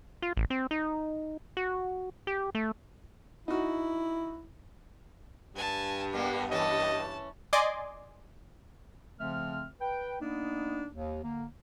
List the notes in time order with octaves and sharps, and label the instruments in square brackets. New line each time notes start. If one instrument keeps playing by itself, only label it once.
[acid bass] F4
A1
C4
D#4
F#4
G4
A3
[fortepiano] D#4 F#4 [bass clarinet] E4
[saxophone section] G2 [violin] G#5 A5
[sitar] G3 G#3 A#3 [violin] B3
[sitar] E3 C#4 [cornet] D#5 [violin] A5
[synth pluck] D5 D#5 G#5 C6 D6
[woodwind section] C#3 F3 A3 C4 E5 F6
B4 G5
A#3 B3 D4 D#4
D#2
D3 A#3